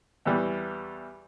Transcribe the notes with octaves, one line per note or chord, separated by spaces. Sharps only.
E2 E3 G3